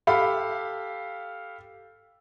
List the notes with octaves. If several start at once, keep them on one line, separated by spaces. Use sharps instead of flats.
G4 A4 F5 B5